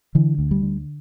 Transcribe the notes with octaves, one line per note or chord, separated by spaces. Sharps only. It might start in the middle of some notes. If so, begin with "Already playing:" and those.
D3 E3
D2
G3
D3